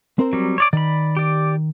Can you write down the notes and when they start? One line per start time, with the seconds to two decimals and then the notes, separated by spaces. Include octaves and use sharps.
0.19 C4 A#4 C5
0.33 F#3 G3
0.58 C#5 D5 D6
0.73 D#3 D5 B5
1.17 G4 D5